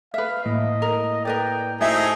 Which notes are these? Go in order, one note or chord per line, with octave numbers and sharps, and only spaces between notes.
B4 E5 F5
A2 A#3 D#5
A#4
A#4 B4 D5 G5
A3 C4 D#4 E4 F#4 G#4 E5 A5